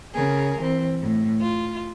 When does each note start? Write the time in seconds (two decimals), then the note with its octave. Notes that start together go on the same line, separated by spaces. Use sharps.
0.14 C#3 G#4 A#4
0.58 E3 C4
1.01 A2
1.40 F4